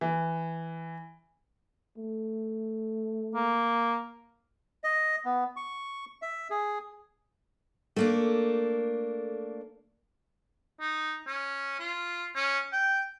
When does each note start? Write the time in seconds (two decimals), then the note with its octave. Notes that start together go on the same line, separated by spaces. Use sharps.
0.01 E3
1.98 A3
3.35 A#3
4.84 D#5
5.25 B3
5.56 C#6
6.22 E5
6.50 G#4
7.96 A3 A#3 D4
10.80 D#4
11.27 C#4
11.79 F4
12.36 C#4
12.73 G5